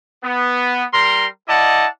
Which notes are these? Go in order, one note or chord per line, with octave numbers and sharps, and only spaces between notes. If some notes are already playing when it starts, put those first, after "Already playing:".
B3
G3 A#4 A#5 C6
E4 D5 D#5 F#5 A5